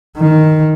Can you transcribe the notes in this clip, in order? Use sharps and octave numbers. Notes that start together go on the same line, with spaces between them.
D#3